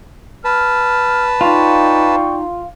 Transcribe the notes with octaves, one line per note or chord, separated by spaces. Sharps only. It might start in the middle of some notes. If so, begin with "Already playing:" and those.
B4 A5 F6
D#4 F4 D5 G5 C#6